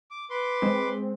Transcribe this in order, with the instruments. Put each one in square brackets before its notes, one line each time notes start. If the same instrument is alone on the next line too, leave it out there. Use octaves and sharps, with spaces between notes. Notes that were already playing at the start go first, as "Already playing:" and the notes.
[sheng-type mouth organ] D6
B4 C6 D6
[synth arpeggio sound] G#3 C4